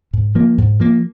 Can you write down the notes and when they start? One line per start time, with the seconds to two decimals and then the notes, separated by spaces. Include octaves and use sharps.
0.13 G#2
0.35 F3 A#3
0.58 G#2
0.80 F3 A#3